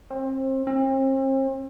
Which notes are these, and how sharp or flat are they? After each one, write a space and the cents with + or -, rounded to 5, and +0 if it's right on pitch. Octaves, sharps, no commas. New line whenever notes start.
C4 +30
C4 +40